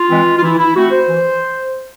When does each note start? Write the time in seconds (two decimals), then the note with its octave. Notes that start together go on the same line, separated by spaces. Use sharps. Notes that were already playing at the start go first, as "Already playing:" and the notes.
Already playing: F4
0.09 E3 G#3 C4
0.38 F4
0.42 E3 E4
0.58 E4
0.75 A3 C4 F#4
0.91 C5
1.07 E3